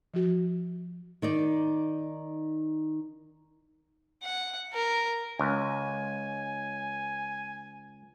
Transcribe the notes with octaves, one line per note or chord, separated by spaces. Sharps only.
F3 F#4
D#3 D#4 D5
F#5
A#4
C#2 G#5